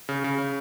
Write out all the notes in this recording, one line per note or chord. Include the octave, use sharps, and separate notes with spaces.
C#3
C#3
C#3